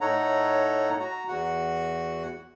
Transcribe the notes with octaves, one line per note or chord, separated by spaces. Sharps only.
A2 D#4 A4 C#5 F#5 A#5
F#4 A#5
E2 F#4 F#5